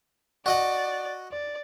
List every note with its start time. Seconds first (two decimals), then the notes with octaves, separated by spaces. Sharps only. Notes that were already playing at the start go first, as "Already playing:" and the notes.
0.46 F#4 D5 D#5 F#5
1.31 D5